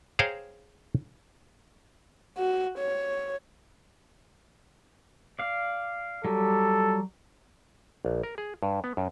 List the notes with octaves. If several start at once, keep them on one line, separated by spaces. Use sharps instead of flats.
G#4 C5 C#5 F5 G5 A#5
F#4
C#5
D5 F5
F#3 G3 A4
A#1
A#4
G#4
G2
B3
F#2